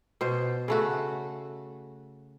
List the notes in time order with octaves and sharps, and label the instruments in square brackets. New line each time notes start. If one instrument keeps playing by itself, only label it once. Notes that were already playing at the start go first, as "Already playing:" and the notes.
[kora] B2 C5
C#3 A3 F#4